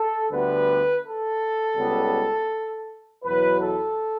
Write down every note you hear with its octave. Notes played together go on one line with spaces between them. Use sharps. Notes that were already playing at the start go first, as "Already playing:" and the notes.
Already playing: A4
D2 D3 G3 B3 B4
A4
C#2 C#3 G3 B3
E2 B2 F#3 B4
A4